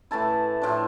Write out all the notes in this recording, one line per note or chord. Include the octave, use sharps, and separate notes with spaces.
A2 E3 A3 E4 A5
A2 F3 A3 D4